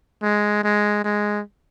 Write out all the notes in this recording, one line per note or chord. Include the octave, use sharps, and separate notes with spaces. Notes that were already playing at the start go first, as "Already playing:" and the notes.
G#3
G#3
G#3